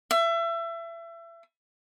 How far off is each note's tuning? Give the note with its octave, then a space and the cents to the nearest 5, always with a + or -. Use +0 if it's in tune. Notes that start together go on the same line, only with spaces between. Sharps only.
E5 +30